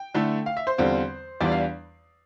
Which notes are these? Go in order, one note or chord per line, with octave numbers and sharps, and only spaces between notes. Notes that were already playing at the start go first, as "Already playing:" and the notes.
Already playing: G5
D3 A3 E4
F5
E5
C5
E2 D3 G3 C4 F4
E2 E3 G3 D4 F4 D5
F5